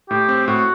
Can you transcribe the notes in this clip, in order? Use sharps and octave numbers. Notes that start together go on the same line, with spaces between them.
A2 G4
C4
A2 F#4